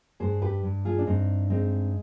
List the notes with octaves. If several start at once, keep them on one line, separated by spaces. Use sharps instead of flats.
G2 G#4 C5
G4 B4
G2
F4 G#4
D4
G2 C4 D#4
G#3 C4 D#4